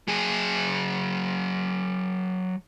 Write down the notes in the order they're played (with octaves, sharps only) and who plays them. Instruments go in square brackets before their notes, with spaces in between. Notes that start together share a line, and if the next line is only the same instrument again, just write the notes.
[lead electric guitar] F#3 G#4